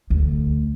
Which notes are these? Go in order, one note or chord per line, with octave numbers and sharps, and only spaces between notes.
D2